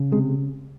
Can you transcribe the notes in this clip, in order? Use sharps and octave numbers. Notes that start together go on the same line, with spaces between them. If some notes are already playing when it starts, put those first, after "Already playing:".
Already playing: C#3
C3 G#3